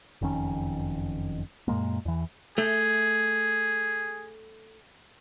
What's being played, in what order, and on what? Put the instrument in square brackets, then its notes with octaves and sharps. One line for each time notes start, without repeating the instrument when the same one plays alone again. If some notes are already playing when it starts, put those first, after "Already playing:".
[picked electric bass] F#1 F2 D#3 C#4
F#2 A#2 G#3 A#3
E2 E3
[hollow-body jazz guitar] A3 [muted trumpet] G#4